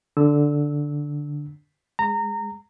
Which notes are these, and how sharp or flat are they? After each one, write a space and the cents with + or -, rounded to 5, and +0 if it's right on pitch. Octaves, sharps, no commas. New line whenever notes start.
D3 +0 E6 -20
G#3 -10 A#5 -25